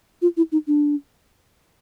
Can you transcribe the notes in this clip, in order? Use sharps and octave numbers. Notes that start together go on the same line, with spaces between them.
F4
E4
D#4
D4